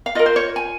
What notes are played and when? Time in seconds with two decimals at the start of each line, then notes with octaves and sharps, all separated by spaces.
0.06 F5
0.15 F4 A#4 D#5
0.26 C5
0.36 C#5
0.56 G#5